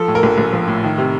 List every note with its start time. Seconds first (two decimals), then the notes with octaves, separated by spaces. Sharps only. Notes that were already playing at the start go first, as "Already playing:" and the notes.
Already playing: F3 A4
0.08 A2
0.15 A#4
0.23 A#1
0.38 A#1
0.53 F3
0.68 A2
0.84 D#3
0.98 C3